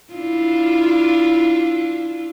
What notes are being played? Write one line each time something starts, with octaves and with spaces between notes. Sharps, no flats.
D4 E4 F4